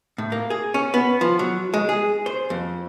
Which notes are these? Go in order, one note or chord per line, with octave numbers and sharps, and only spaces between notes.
A2
A#3
G#4
C#4
B3
F3
F#3
G#3
G#4
C5
F2